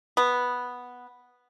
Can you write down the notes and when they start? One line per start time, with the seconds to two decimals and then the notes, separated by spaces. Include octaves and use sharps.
0.17 B3